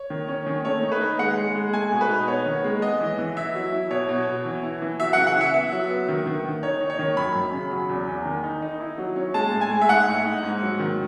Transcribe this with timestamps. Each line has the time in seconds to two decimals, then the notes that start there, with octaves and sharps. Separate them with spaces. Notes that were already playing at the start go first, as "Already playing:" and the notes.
Already playing: C#5
0.10 D#3
0.28 C#4
0.46 D#3
0.65 A3 C#5
0.83 D#4
0.92 B4
1.01 D#4
1.19 G#3 F#5
1.37 G#3
1.55 G#3
1.73 A3 G#5
1.92 B2
2.01 B4
2.09 D#4
2.27 B3 C#5
2.46 D#3
2.64 G#3
2.82 B3 D#5
3.00 E3
3.18 E3
3.37 E4 E5
3.54 F#3
3.73 E4
3.91 B2 C#5
4.09 B2
4.27 B2
4.45 E3
4.63 E4
4.82 E3
5.00 F#3 E5
5.13 C#3 F#5
5.27 F#5
5.36 E4
5.41 E5
5.54 B3 E5
5.72 F#3
5.90 B3
6.08 D#3
6.26 D#3
6.45 D#3
6.63 D#4 C#5
6.81 D#4
6.90 C#5
6.99 D#3
7.17 F#2 B5
7.35 F#2
7.53 C#3
7.71 F#3
7.89 E2
8.07 E2
8.25 D#3
8.44 D#4
8.62 D#4
8.80 E4
8.98 F#3
9.16 C#4
9.34 G#3 A5
9.52 A2
9.61 G#5
9.71 G#3
9.81 E5
9.89 D#4 F#5
10.07 A2
10.25 D#4
10.43 G#2
10.61 F#3
10.79 D#3